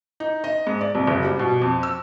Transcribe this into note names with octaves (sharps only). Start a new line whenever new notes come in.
D#4
D#5
G#2
D5
C2
F#1
G3
B2
F2
E6